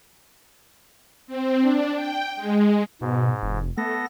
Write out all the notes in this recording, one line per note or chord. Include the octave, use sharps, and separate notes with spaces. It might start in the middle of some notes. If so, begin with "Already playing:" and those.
C4
D4
G5
G#3
G#2 B2
F1
A3 B3 A4 A#6